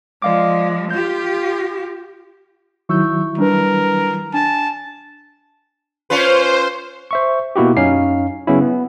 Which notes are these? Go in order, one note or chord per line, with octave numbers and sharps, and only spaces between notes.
F3 G#3 D5 F5 D6
F4 G4 G6
D#3 F#3 E4 C#6 E6 G6
G3 D4 A#4 B4
D4 G#5 A5
C#4 F4 B4 C5
C5 E5 C#6
B2 A#3 E4 F#4 G4
F#2 C#4 D#4 F5 C7
C#3 F#3 B3 C#4 E4
B3